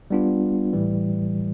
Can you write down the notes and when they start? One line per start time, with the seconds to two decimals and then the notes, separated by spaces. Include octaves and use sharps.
0.10 G3 B3 D4 F4
0.73 A2 E3 G3